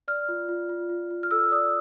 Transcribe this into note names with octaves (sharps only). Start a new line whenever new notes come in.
D5 F6
F4
F4
F4
F4
F4
F6
A4 E6
D5 D#6